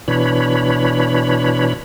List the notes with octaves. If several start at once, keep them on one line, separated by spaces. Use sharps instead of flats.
B2 E3 D4 C#5 B5